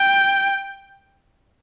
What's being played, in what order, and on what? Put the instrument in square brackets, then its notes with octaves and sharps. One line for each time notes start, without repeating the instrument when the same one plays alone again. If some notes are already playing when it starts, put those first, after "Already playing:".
Already playing: [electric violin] G5